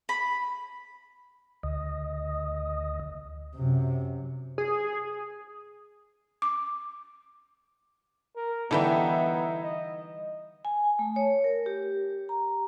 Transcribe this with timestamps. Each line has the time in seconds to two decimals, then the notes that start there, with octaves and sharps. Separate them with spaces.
0.09 B5
1.63 D2 D#5
3.55 F#2 C3
4.58 G#4
6.42 D6
8.36 A#4
8.71 D3 E3 G3 B3 D#4 E4 E5
9.63 D#5
10.65 G#5
10.99 A3
11.16 C#5
11.44 A#4
11.66 G4
12.29 A#5